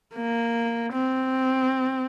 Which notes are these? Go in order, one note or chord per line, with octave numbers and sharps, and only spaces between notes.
A#3
C4